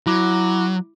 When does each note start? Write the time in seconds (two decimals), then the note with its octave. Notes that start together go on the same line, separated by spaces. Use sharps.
0.06 F#3 E4 D6